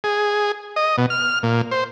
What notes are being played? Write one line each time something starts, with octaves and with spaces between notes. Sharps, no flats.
G#4
D#5
B2
F6
A#2
C5